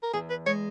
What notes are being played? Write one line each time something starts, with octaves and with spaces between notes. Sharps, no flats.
A#4
E2 G#4
B4
G#3 C#5